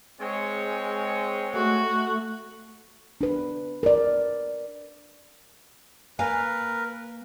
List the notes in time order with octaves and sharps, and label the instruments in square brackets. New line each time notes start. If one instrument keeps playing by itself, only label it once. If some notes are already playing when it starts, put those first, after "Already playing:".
[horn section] G#3 C4 C#5
[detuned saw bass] A3 [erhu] F#4
[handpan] D4 B4
A#4 D5
[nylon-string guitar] A#3 F5 G#5 [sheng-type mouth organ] A#4 B4